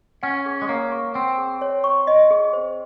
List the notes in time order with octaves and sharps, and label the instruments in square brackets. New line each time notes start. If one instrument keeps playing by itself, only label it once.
[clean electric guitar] C#4 [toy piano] F#5
[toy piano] G#4
[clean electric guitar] G#3
[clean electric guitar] A#3 [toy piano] C#5
[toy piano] C#6
[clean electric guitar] C4 [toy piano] F#5
[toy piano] G#4
C#5
C#6
D#5
G#4
C5